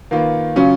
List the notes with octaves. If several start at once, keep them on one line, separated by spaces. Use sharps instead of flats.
D#3 A#3 F4 B4
C#3 F#3 C#4 F4